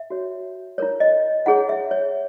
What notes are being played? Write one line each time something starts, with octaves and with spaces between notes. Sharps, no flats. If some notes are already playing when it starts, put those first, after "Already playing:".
Already playing: E5
F#4 C#5
E4 A#4 C#5
D#5
E4 G#4 C#5 F#5
E5
C#5